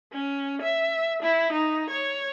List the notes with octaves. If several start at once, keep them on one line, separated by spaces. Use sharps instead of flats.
C#4
E5
E4
D#4
C#5